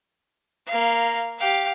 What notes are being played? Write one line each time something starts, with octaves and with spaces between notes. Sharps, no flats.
A#3 F5
G4 F5